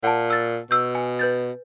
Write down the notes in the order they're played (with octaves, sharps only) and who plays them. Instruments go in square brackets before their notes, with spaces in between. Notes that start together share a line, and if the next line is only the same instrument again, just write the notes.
[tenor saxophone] A#2 [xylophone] F#5 A5
[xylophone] E6 A6
[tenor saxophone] B2 [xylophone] E6 G6
[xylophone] G#5
B4 G6 A6